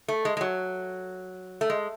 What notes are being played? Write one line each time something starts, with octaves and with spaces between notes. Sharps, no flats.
A3
G#3
G#3
F#3
A3
G#3